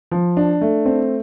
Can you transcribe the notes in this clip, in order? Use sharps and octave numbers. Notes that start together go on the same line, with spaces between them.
F3
D4
A3
C4